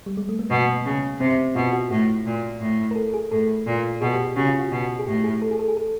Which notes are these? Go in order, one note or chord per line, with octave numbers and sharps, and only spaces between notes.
G3
G#3
A3
A#3
B2 B3
C#3
C3 C4
B2 F4
F#4
A2 F#4
A#2
A2
A#4
A4
G#4
A2 A4
A#2
B2 G#4
G4
G4
C#3 F#4
F4
F#4
B2
G#4
A2 G4
G#4
A4
G#4
A4
G#4
A4